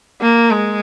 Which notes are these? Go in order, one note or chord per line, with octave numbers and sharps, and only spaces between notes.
A#3
G#3